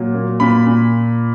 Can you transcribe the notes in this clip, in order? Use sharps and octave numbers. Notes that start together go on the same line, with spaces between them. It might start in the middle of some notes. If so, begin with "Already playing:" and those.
Already playing: A#2 F#3
A#3
A#2 B5
A#2